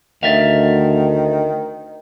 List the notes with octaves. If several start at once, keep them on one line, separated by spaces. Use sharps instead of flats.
D2 D#3 D5 E5 F5